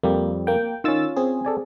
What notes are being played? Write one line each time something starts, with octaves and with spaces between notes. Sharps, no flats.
F2 G3 A#3 G4
A#3 G5
D#3 C#4 F4 E6 A6
C4 G#4
A4 D5 G#5